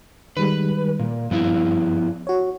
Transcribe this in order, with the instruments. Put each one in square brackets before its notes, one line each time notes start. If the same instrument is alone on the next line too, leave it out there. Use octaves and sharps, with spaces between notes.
[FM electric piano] D#3 G3 G#3 [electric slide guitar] B4
[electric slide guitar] A#2
[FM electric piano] G2 [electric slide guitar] F3 B3 E4
[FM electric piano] F#4 C#5